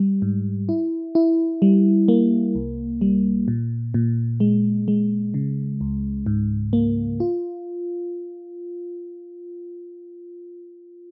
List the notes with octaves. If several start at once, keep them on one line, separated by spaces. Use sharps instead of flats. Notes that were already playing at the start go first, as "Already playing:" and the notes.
Already playing: G3
G#2
E4
E4
G3
A#3
C2
G3
A#2
A#2
G#3
G#3
C#3
C#2
G#2
A#3
F4